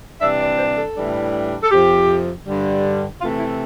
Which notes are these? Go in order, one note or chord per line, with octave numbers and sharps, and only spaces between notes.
C3 E3 G3 D4 E5
D5
C5
A4
A2 E3 G3 D4
A4
F2 C3 F3 G4
G2 D3 G3
C3 E3 A3 F4
E4